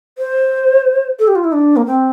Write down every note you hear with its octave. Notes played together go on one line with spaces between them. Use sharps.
C5
A4
G4
F4
E4
D4
A#3
C4